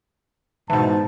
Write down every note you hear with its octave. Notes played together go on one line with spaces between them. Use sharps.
G#2 B2 E3 A5